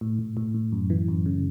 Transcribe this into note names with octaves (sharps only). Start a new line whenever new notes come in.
A2
A2
A2
A2
F#2
E3
F#2
C#3